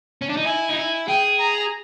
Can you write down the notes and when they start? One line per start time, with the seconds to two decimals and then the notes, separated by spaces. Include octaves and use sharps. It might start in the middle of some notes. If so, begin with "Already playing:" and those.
0.22 C#4
0.29 D4
0.37 D#4
0.44 E4 G#5
0.69 D#4
0.76 E4
1.07 G#4 G5
1.39 A#5